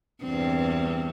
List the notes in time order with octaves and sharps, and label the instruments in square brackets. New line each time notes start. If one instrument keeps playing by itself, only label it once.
[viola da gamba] E2 G2 C4